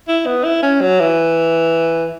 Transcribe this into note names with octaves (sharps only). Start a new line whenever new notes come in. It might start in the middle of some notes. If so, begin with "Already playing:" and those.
E4
B3
E4
C#4
F#3
E3